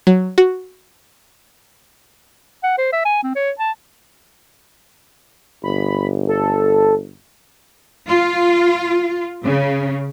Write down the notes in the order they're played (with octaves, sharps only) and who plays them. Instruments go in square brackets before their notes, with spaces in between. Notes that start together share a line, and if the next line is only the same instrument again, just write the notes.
[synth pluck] F#3
F#4
[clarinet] F#5
C5
E5
G#5
C4
C#5
A5
[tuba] G1 [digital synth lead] B5
[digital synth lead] A4
[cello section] F4
C#3